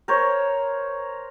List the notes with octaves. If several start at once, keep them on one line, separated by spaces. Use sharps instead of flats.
A#4 C5 C#5